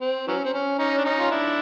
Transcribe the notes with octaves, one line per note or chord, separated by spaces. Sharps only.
C4
E3 F#3 C#4
C4
C#4
C#4 D#4
D4
C#4 D#4
F4
D4 E4